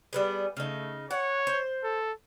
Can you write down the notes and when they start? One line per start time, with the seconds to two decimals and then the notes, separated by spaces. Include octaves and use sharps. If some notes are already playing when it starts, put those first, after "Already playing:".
0.13 G3 B3 G#4
0.57 C#3 A3 D#4
1.11 C#5 F#5
1.47 C5
1.84 A4